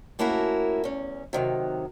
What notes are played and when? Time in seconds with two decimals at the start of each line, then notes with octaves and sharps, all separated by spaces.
0.19 A3 A#3 C#4 E4 F#4 A#4
0.84 E2 C#4
1.33 C3 D#3 F#3